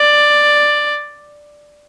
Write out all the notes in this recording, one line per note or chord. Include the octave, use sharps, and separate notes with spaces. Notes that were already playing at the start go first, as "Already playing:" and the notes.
Already playing: D5